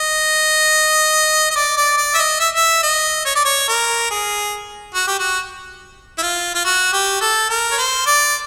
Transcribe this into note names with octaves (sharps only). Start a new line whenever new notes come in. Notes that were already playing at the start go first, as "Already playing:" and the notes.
Already playing: D#5
D#5
D5
D5
D5
E5
D#5
E5
E5
D#5
C#5
D5
C#5
A#4
G#4
F#4
G4
F#4
E4
F4
F4
F#4
G4
A4
A#4
C#5
C5
D5